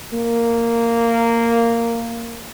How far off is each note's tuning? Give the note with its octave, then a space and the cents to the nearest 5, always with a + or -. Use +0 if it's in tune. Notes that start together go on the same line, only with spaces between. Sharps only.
A#3 -10